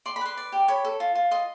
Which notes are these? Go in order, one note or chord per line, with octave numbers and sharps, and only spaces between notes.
D5 C6
B5
B4 C6
D5
G4
C#5 B5
A4
F4
F4
D#5 C6